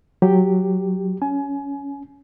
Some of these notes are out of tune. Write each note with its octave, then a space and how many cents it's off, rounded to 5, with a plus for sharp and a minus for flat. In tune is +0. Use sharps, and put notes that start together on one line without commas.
F#3 +0 G4 +0
C#4 +15 G#5 +25